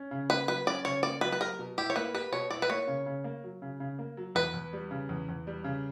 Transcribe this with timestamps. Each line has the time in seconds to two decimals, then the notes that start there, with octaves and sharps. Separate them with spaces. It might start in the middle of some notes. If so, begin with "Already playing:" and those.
Already playing: C#4
0.11 C#3
0.30 A#3 B4
0.48 F#3 B4
0.67 C#4 D5
0.85 C#3 C#5
1.03 A#3 D5
1.21 F#3 B4
1.32 B4
1.41 G4 A#4
1.59 B2
1.78 E4 G4
1.90 C#5
1.96 A#3 B4
2.14 G4 B4
2.32 B2 C#5
2.50 E4 D5
2.62 B4
2.70 A#3 C#5
2.87 C#3
3.06 C#3
3.24 A#3
3.44 F#3
3.62 C#3
3.80 C#3
3.99 A#3
4.17 F#3
4.35 E2 B4
4.54 E2
4.73 G3
4.91 C#3
5.09 E2
5.29 E2
5.47 G3
5.64 C#3